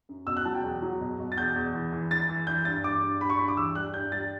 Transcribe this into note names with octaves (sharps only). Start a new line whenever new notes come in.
F#2
B2 E6
F#6
F#3 A5
G5
E2
F#3
B2
B2
A6
E2 G6
E2
E3
E3
E3 A6
E3
E3 G6
G2 A6
G2 D6
G2
G2 B5
C#6
G2 B5
D6
E3 E6
G3 F#6
G2 G6
G3 A6